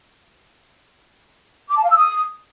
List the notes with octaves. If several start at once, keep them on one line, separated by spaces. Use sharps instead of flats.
D6
A5
F5
E6
D#6